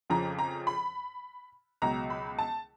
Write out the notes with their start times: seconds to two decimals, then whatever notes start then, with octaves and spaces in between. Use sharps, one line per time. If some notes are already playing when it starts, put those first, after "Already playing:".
0.10 F2 C#3 F3 A#5
0.39 A#5
0.67 B5
1.82 C#2 B2 F#3 A#5
2.10 B5
2.39 A5